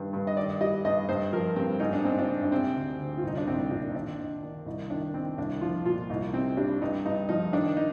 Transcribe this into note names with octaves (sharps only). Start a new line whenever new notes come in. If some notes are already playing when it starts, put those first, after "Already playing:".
Already playing: G2 D#3
G2
D#5
D#3 D5
G3 D#5
G2 D#5
G2 C5
F3 A#4
G2 C4
G#2 D#4
D4
G#2 C4
D4
G#2
D4
C3 C4
D2
D2
F4
C2 D#4
D4
C2 C4
A#2 D4
D#4
D#3 D4
D#3
D#3
C2 D#4
D#3 D4
D#3 C4
C2 D4
F3 F4
A#2 F4
C2 D#4
C3 C4
G3 D4
G2 D#4
G2 D#4
F3 D#4
D#3 D4
D#4